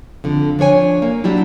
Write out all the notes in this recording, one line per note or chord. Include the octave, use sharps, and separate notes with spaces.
F2 D3
F3 D4 C#5 G#5
A#3
F#3 G3 D4 E4